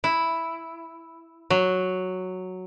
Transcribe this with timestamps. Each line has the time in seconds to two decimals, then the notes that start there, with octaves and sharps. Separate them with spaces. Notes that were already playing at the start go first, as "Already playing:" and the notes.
0.04 E4
1.50 F#3